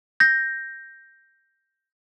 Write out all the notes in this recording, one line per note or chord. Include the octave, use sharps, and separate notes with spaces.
G6 A#6